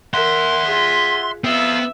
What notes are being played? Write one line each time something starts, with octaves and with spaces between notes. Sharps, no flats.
A#4 E5 F#5 C6
F4 G#4
B3 C4 F4 E5